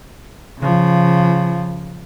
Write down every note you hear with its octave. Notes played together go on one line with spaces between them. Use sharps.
C#3 F3